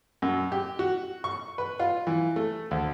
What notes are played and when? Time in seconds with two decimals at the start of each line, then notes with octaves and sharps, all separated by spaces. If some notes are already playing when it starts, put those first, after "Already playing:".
0.22 F#2
0.52 G4
0.79 F#4
1.24 C#6
1.58 B4
1.79 F4
2.07 E3
2.36 A3
2.71 D2